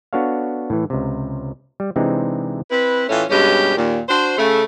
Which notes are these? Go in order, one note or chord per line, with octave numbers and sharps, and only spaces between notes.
B3 D4 F#4 A4 C#5 F5
A2 E3
C#2 C3
G3
C3 E3 G#3 C4 D4 D#4
C4 E4 B4
A2 E3 A3 C#4 F4
G2 B2 G#3 C#4 G4
D#2 A#2
D4 F#4 C5
C#3 A3